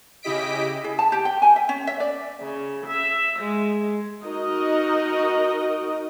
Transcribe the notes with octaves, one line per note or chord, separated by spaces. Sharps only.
C#3 E4 G4 D#5 B6 D7
G#4
A5
G4
G5
G#5
E5
C#4
E5
D5
C#3
E5
G#3
D#4 F#4 A#4 D#5